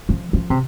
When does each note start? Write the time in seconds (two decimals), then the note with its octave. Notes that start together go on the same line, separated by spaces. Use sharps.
0.09 F3
0.33 F3
0.50 C3